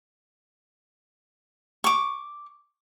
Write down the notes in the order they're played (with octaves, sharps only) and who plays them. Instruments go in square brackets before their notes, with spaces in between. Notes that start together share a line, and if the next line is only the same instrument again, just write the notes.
[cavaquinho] C#6 D6